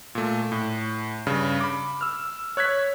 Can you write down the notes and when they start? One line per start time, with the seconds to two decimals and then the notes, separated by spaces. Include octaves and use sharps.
0.15 A#2 A3
0.52 A2
1.27 G2 C#3
1.61 B5 D6
2.01 E6 F6
2.57 C#5 F#6 G#6 B6